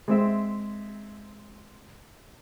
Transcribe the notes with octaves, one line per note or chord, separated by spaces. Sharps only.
G#3 C4 E5